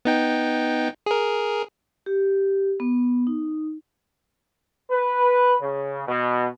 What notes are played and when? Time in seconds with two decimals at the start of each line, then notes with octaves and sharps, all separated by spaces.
0.05 B3 D#4 G5
1.06 G#4 A#4
2.06 G4
2.80 B3
3.27 D#4
4.90 B4
5.61 C#3
6.08 B2